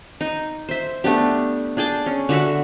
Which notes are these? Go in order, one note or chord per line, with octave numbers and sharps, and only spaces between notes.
D#4
C5 E5
A3 B3 D4 G4
D4 G#4 G5 A5
C#4
D3 F#4 E5 F#5